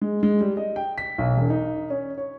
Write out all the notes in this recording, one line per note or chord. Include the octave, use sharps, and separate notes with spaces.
G#3
G#3
G3
D#5
G5
B6
B1
E1
D#4
C#4
C#5